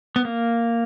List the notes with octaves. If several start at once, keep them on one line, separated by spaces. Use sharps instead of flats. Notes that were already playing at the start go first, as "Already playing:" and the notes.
B3
A#3